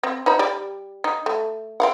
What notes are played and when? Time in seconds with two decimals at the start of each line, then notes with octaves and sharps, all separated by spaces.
0.03 C4
0.26 D#4 C5 B5
0.39 G3 D5
1.04 D#4
1.26 A3
1.80 C4 F5 F#5